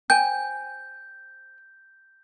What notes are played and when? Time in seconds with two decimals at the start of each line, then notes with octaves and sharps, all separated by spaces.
0.10 C5 G5 G#5 G6